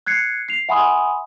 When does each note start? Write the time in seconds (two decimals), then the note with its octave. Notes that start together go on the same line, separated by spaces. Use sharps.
0.06 F#6 G#6 C7 C#7
0.48 C7 F7
0.69 E5 F#5 G#5 B5 C6 D#6